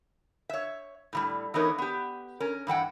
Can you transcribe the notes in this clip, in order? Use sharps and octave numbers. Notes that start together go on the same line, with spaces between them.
C#5 E5
A2 E3 G3
E3 A3 B3 D#4 A#4 C#5
B3 G4
C#4 A#4
G2 E3 F#5 G5